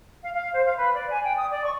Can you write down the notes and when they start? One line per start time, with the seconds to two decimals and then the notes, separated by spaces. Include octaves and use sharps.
0.22 F5
0.34 F5
0.53 C5
0.65 F5
0.77 B4
0.94 D5
1.10 G#5
1.23 G5
1.36 D#6
1.51 D5
1.65 C#6